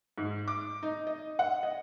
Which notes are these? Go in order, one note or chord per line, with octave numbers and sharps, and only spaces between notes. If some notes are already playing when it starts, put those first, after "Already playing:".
G#2
D6
D#4
D#5
F#5
D#5